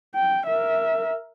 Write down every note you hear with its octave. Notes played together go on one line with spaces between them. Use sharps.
G5
A#4 E5